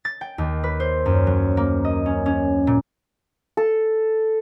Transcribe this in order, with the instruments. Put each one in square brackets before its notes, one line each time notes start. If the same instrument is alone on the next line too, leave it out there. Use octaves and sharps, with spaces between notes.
[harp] A6
G5
D#2
B4
C5
F#2
F#3
A#3
D#5
C#4
C#4
A#2
[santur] A4